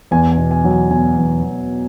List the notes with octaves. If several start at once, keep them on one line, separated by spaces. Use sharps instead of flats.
E2 G#5
G#5
B2
G#5
F#3
G#5
B2 G#5
E2
E2